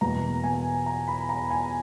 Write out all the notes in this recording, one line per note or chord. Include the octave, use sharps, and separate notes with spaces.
E2 B2 A#3 A#5
G#5
A#5
B5
A#5
G#5